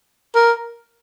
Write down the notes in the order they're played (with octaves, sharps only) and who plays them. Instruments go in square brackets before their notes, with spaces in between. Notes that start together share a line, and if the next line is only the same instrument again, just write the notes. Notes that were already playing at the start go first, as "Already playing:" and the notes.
[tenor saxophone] A#4